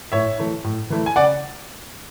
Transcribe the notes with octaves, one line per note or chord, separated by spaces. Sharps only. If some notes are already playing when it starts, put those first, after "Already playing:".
A2 C#5 E5
E3 A3 E4
A2
E3 A3 E4
G#5
C#3 D5 F#5